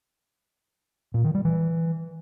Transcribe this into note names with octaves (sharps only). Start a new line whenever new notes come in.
A#2
D#3
G3
E3